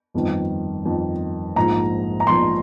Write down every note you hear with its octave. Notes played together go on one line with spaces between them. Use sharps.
G1 F2 D#3
G1 F2 D#3
A#1 G#2 F3 A#5
A#5
A#1 G#2 F3 C6